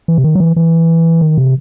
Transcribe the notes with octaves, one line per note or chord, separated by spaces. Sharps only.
E3
C3
D#3
F#3
E3
E3
D#3
C3